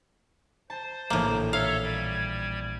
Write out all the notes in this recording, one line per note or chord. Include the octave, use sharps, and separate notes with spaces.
C5 A5
A#1 A2 E3 A#3
A4 C#5 E5 F5
G3 G#6